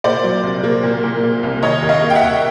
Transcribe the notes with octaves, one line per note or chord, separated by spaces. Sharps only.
A#2 C5 D5
F#3
C2
A#3
A#2
A#2
A#3
C2
D#3 C#5 D#5
D#2
D#5 F5
A#3
G5
E5 F#5
D#2